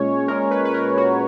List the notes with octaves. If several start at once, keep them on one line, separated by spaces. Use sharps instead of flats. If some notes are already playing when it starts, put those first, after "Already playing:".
Already playing: A#2 G#3 C#4 C#5
A#2 G#3 C#4 A#4
B4
B4
A#4
F#4